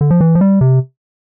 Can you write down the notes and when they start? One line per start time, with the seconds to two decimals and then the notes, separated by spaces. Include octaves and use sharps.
0.01 D3
0.11 F3
0.21 E3
0.35 F3
0.41 G3
0.61 C3